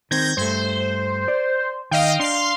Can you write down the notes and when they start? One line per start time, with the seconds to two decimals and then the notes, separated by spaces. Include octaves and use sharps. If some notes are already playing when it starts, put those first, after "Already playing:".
0.11 D#3 C4 G6 G#6 A#6
0.37 G2 A3 C5
1.28 D5
1.91 D#3 D#5 F5 G5
2.20 D4 F5 C6